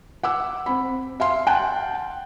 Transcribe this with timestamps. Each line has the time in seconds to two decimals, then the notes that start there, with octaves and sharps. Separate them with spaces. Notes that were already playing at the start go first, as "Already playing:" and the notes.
0.23 F#5 D6 E6
0.66 C4 B5
1.20 E5 F5 C6
1.47 F#5 G5 A5 F#6